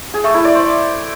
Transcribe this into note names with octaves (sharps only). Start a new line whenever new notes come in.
G#4
A3
E4
D5
C5